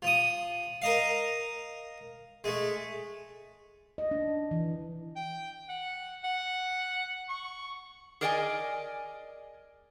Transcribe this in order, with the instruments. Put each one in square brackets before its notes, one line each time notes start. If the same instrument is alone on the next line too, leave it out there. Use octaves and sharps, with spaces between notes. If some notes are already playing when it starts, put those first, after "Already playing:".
[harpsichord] F3 D#6
A#4 D#5 F5
G#3 A3
[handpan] D#5
D4
E3
[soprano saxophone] G5
F#5
F#5
C#6
[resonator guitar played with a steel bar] G#4 A#4 D5 D#5 F#5 G#5